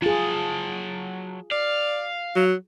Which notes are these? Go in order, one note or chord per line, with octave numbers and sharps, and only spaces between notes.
F#3 F4 G#4 A5
D5 F5
F#3